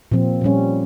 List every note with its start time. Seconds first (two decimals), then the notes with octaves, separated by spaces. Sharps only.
0.12 A#2 F3 C4
0.41 A#2 G3 C#4